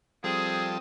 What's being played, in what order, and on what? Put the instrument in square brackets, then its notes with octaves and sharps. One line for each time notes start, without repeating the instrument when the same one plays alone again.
[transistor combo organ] F3 G3 A4 [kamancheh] C4 D#6 [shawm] G#4